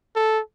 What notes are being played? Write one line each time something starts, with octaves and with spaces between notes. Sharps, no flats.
A4